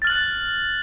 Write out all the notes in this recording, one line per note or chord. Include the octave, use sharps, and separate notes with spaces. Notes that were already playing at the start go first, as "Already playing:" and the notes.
F6 F#6 A6 F#7